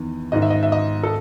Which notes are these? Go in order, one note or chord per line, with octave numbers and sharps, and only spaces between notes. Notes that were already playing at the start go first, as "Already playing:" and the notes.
Already playing: E2 D#3
G#2 D#3 D#5
E5
D#5
E5
D#5
A4